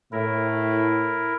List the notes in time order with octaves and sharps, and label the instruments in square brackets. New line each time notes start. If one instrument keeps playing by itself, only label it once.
[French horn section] A2 [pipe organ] E4 A#4